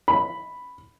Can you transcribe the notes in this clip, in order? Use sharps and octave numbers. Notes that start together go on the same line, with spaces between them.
B5